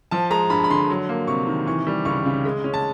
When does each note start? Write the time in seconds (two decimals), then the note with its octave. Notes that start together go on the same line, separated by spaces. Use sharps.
0.11 F3 A5
0.30 G#3 A#5
0.50 G2 B5
0.64 B5
0.70 D3 C6
0.90 F#3
1.09 A#3
1.27 C3 C#6
1.47 D#3
1.66 E3 C#6
1.87 G3
2.05 C#2 C#6
2.25 C#3
2.45 G#3
2.64 C#4
2.74 A5